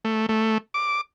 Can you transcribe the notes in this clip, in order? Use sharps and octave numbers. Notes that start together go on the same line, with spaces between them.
A3
A3
D6